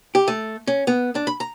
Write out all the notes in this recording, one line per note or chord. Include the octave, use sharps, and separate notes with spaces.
G4
A3
C#4
B3
D4
B5
A#5